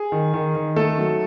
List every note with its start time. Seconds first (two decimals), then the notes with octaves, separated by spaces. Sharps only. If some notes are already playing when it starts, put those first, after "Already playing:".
Already playing: G#4
0.12 D#3
0.34 D#3
0.55 D#3
0.76 A3 A4
0.98 F#3